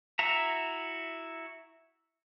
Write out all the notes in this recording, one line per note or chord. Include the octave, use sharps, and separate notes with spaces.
E4 F#4 E5 A#5